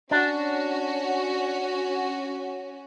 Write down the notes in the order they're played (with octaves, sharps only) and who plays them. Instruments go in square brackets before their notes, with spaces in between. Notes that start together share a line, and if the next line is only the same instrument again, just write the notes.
[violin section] C#4 F#4 [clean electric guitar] D4